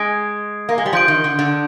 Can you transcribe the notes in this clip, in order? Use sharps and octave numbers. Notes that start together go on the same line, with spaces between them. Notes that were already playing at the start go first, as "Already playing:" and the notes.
Already playing: G#3 D#6 G#6 D7
A#3
G#3
G3
F3 C6 G6 D7
D#3
D3
D3